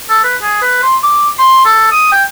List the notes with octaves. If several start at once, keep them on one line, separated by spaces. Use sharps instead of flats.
A4
B4
G#4
B4
C6
D6
C6
A4
D#6
G5